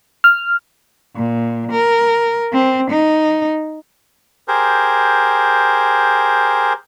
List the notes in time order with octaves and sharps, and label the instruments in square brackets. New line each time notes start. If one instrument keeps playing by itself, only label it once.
[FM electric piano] F6
[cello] A#2
A#4
C4
D#4
[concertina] G4 G#4 A#4 C5